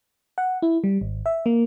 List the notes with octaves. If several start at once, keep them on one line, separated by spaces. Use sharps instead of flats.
F#5
E4
G3
G#1
E5
A#3